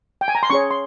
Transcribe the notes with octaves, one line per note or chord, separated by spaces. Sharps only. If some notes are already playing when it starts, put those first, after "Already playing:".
G5
G#5
A#5
C6
C#4 G#4 C#5 C#6
C6